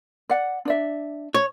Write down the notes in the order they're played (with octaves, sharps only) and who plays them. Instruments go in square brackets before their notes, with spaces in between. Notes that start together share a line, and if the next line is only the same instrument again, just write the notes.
[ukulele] D5 F#5
D4 D5 E5
[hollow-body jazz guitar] C#5